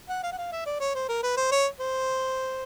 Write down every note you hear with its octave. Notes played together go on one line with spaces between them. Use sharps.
F#5
F5
F#5
F5
E5
D5
C#5
C5
A#4
B4
C5
C#5
C5